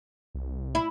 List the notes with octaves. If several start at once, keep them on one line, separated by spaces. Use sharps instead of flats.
C2
E4